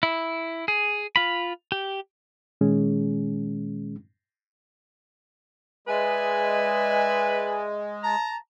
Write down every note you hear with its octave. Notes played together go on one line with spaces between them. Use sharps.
E4
G#4
F4 B5
G4
A#2 D#3 G#3 C#4 G#4
G#3 B4 D5 E5 G#5
A5 A#5